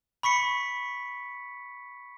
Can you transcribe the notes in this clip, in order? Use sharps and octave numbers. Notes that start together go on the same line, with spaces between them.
B5 C#6 B6 C#7